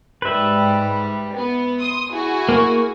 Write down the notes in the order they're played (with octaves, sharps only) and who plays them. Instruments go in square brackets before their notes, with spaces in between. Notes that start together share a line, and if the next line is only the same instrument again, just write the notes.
[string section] G#2 G3 [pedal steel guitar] B4 E5
[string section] B3
C6 D#6
E4 F#4 G#4
[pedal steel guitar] A#3 C#6